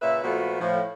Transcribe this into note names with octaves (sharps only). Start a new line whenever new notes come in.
A#2 C#3 B4 E5
A#2 F3 A3 B3 F#4
A2 F3